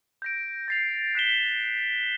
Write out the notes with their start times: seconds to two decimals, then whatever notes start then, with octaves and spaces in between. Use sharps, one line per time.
0.22 G6 A#6 D7
0.68 A6 C7 F7
1.15 F#6 B6 E7 G7